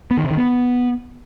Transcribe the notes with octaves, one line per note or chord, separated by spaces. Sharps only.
B3
D#3
C3
D#3
B3